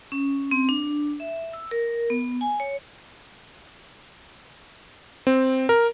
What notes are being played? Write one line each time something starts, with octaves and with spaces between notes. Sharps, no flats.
C#4
C4
D4
E5
E6
A#4
B3
G#5
C#5
C4
A#4